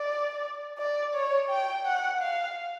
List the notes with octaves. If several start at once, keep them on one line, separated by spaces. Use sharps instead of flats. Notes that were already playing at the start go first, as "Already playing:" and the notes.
Already playing: D5
D5
C#5
G5
F#5
F5